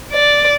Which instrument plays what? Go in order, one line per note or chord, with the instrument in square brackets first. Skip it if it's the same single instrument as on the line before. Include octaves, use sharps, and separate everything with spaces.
[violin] D5